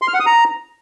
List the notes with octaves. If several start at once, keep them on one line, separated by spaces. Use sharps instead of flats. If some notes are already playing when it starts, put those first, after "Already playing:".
C6
F6
F#5
D#6
A#5